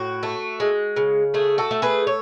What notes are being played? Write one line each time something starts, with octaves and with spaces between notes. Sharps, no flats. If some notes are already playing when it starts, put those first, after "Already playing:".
Already playing: A2 F#4
A3
G#3
C#3
A3 G#4
F#4 A4
A3
G#4 B4
C#5